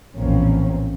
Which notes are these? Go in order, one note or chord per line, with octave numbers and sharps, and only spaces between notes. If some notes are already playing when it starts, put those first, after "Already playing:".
A#1 E2 A2 A#3 C4 C#4